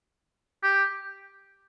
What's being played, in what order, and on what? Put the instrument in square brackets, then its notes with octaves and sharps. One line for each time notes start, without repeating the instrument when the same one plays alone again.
[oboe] G4